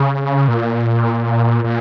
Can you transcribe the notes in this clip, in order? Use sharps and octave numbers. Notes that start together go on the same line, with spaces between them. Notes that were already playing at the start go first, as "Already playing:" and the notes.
Already playing: C#3
A#2
A#2